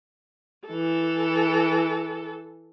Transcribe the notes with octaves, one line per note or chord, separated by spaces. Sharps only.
E3 A4